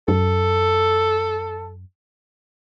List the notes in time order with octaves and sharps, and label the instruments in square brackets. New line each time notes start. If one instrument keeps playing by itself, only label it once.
[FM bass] F#2 [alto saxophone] A4